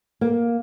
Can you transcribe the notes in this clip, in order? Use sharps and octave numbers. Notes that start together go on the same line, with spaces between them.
A#3